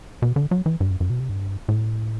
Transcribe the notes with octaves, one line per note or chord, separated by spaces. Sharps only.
B2
D3
F#3
E3
G2
F#2
F#2
B2
C3
G2
A2